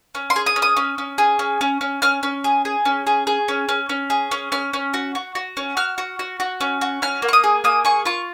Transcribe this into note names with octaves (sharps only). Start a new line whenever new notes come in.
C#4
C6
G#4
D#6
C#4
D#6
C#4
C#4
G#4
C#4
C#4
C#4
C#4 F6
C#4
G#4
G#4
C#4
G#4
G#4
C#4
C#4
C#4
G#4
C#4
C#4 F6
C#4
F#4
F#4
F#4
C#4
F#4 F6
F#4
F#4
F#4
C#4
F#4
C#4 F6
A#3
C#6
D#6
G#4
A#3 D#6
G#4 C#6
F4 C#6